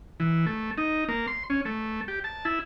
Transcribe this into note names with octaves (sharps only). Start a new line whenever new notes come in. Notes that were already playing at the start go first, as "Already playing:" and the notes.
E3
A3
D#4
A#3
C6
C#4
A3
G4
A5
E4